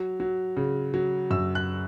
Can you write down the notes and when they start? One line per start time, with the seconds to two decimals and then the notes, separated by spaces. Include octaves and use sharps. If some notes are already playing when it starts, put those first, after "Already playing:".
Already playing: F#3
0.20 F#3
0.57 C#3
0.94 F#3
1.31 F#2 E6
1.55 F#6